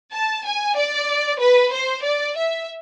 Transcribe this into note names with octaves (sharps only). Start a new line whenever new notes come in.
A5
G#5
D5
B4
C5
D5
E5